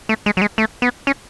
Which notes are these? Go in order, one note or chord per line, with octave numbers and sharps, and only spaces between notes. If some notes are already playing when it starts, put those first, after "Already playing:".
A3
G#3
F#3
G#3
A3
B3
C#4